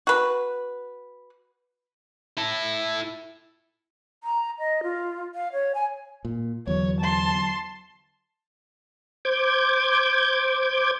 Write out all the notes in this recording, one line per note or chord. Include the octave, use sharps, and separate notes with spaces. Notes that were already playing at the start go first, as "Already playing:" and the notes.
F#4 B4
E4 A4
A#5
D#5
F4
F5
C#5
G#5
A#2
E2 D3 F#3 C#5
A5 C6
C5 D6 G6 G#6